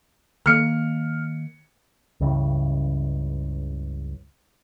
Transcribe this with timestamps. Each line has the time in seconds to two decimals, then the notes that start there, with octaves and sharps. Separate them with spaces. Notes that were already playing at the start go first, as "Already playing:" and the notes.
0.46 D#3 A#3 F6 C#7
2.20 C#2 G2 C#3 E3